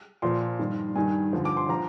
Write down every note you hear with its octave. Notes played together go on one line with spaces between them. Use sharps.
A#2 F3 C6
G2 D#3
G2 D#3 G#5
G2 D3 F3
D6
C6
F3 A#5